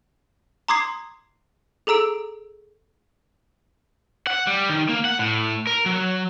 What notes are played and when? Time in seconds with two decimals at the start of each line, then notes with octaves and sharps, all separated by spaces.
0.68 A#5 C6 D6 D#6 G#6 C7
1.87 G#4 A4 A#5 E6 D7
4.27 F#5
4.47 G3
4.69 D#3
4.89 A#3
5.05 F#5
5.19 A2
5.67 A#4
5.86 F#3